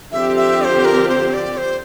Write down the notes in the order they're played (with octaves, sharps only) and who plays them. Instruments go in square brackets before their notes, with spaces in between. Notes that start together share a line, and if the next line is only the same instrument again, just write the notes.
[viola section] D3 F3 C4 G4 [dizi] E5
[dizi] E5
D5
C5
A#4
C5
D5
C5